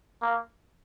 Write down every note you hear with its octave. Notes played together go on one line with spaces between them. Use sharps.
A#3